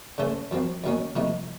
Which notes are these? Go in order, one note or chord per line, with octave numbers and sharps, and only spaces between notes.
C#3 A3 C#4 A4 C5
F#2 F3 C4
F#2 D#3 A#3 C#4
C3 F3 A3 D#4